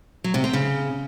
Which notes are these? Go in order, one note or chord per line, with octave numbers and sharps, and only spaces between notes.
F#3
C3
C4
C#3